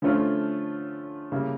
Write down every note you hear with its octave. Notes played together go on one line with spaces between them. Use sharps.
D3 F3 A3 C#4 F4
C#3 G3 A#3 E4